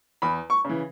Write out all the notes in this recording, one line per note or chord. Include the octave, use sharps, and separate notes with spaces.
E2 B5
C#6
C#3 E3